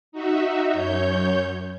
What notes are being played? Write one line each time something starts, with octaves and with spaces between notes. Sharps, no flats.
D#4 F#4 E5
F#2 C#5 G6